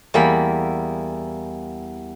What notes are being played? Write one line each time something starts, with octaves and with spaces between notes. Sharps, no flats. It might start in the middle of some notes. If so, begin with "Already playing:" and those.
E2 G3 A#3 B5